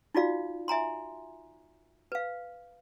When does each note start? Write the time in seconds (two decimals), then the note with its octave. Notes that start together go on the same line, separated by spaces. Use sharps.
0.14 D#4 F4 F#4 D5 F5
0.68 E5 G#5 A#5 C6
2.12 B4 F5